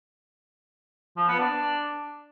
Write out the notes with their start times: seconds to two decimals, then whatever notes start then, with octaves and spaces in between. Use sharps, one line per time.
1.17 F3
1.28 B3
1.40 D4